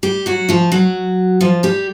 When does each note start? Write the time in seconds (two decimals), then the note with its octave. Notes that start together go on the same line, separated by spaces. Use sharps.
0.03 G3 G4
0.26 F#3 F#4
0.49 F3 F4
0.72 F#3 F#4
1.41 F3 F4
1.63 G3 G4